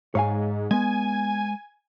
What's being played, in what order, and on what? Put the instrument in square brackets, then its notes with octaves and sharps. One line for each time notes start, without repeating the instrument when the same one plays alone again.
[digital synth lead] G#2 [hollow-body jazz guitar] C#5 F5 G#5
[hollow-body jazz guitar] G#3 B3 [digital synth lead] G#5